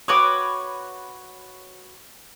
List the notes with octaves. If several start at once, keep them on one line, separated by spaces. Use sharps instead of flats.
F#4 B4 C#5 D6 D#6